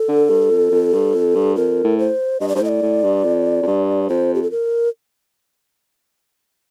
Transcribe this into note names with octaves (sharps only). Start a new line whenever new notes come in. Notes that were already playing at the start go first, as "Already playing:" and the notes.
Already playing: A4
D3
G2
F2
F2
G2
F2
G2
F2 A#4
A2
C5
G2 D#5
D5
G2 C5
A2 D#5
D5
A2
G2
F2
F2
G2
F2 C5
G4
A4
A#4